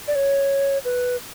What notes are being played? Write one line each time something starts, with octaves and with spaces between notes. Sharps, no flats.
D5
C#5
B4